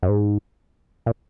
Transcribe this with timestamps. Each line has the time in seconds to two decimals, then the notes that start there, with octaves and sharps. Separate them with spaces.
0.03 F#2
0.09 G#2
1.06 A#2